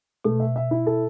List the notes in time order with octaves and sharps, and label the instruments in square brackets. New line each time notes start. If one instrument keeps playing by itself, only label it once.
[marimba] B2 [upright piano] A3
[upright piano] E5
E5
E4
A4